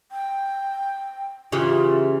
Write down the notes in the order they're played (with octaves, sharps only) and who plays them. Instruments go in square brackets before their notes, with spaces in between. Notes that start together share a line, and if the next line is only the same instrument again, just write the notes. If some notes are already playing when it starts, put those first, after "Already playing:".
[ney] G5
[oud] C#3 E3 G4 [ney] F4